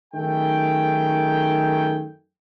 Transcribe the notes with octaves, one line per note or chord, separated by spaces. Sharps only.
F#2 D#3 A3 G#4 G5